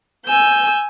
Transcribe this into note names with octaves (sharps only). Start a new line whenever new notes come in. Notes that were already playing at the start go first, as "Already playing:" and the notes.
G#5 E6 G6